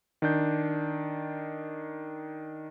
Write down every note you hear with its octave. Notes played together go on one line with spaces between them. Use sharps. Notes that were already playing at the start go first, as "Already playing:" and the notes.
D#3 D4 G6